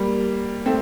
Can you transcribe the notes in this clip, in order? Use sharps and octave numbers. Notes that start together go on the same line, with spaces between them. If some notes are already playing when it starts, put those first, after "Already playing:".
Already playing: G3 A#3
A3 C4